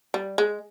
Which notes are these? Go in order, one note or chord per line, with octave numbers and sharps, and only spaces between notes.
G3
G#3